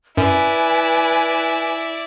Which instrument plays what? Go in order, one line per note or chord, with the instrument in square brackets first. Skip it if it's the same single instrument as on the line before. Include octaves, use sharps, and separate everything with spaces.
[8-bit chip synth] F#2 [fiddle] E4 D5 [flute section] B4 G#5